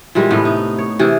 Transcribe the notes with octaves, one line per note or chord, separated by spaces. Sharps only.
A#2 E3 G3 G#3
A2 C3 B3
D#4
C#5
C3 E3 G#4